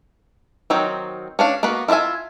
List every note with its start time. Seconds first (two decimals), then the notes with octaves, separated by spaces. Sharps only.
0.70 D#3 F#3 C4
1.39 C#4 D4 F5
1.63 A#3 B3 F#4 B4
1.88 E4 F4 A#4 E5 G#5